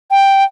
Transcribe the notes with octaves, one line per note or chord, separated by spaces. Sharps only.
G5